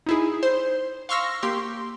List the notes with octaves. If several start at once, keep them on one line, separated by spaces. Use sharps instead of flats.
D#4 E4 G#4
C5
F5 C6 C#6 E6 F6 A#6
A#3 G4 C6